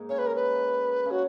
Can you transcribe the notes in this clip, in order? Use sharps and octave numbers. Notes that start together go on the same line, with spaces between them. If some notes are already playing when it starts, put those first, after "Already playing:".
Already playing: G#2 G#3 A#3
C#3 C#4 C#5
B4
A#4
B4
C#3 C#4
F#4